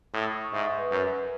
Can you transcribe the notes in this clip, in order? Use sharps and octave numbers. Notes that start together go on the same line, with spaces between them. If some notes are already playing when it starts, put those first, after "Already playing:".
A2 D#6
E6
D#6
C#6
G#2 E5
E5
B4
F#2 B4